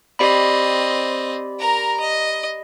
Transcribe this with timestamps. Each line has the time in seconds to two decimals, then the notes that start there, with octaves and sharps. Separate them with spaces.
0.19 C4 G4 D5 D#5 B5
1.59 A#4 A#5
2.00 D#5